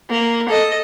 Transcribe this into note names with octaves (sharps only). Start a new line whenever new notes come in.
A#3
A4 D#5